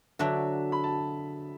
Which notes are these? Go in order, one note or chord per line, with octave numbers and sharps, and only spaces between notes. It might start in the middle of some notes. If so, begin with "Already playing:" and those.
D3 F#3 D4 F#4 E5
B5
A5